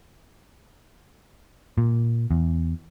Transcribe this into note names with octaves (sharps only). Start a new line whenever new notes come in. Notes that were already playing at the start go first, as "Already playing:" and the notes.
A#2
E2